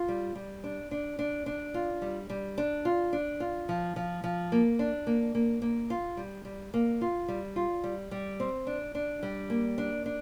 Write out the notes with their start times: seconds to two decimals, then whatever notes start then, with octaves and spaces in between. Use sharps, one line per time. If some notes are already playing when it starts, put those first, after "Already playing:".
Already playing: F4
0.08 G3
0.35 G3
0.64 D4
0.91 D4
1.19 D4
1.46 D4
1.74 F4
2.02 G3
2.30 G3
2.58 D4
2.85 F4
3.13 D4
3.40 F4
3.69 F3
3.96 F3
4.24 F3
4.52 A#3
4.79 D4
5.07 A#3
5.35 A#3
5.62 A#3
5.90 F4
6.17 G3
6.45 G3
6.74 A#3
7.01 F4
7.28 G3
7.56 F4
7.84 G3
8.11 G3
8.40 C4
8.67 D4
8.95 D4
9.23 G3
9.50 A#3
9.78 D4
10.06 D4